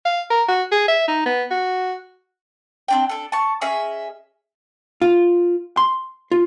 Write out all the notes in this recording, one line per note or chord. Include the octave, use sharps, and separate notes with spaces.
F5
A#4
F#4
G#4
E5
D#4
B3
F#4
C4 D4 G5
D4 A4
A5 C#6
C#4 G#4 D#5 E5
F4
C6
F4